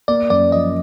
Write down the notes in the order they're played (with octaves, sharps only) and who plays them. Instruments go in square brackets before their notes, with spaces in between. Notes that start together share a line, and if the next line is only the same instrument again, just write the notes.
[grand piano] A#3 [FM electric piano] D5
[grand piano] F#2 [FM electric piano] D5
[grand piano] F3 [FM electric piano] D#5